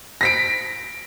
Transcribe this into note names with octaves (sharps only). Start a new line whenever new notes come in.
A#6 B6 D7